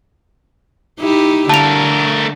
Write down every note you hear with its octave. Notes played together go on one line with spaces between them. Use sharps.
D#4 E4 G4
D3 A3 A#4 A5 F7